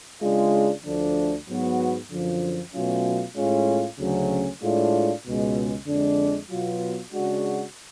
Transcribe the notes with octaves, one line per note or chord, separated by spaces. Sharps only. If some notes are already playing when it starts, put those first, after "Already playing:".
C#3 G#3 D4 F4
D2 D3 F3 A3 D4
G#2 F#3 B3 F#4
F#2 D3 F3
B2 F#3 A3 C#4 F4
A2 G#3 C#4 F4
D2 C#3 F#3 A3 C#4
A2 G#3 D4 F4
C#2 B2 G#3
F2 D3 G#3 D4
B2 F#3 B3 F4
C#3 G#3 D4 F#4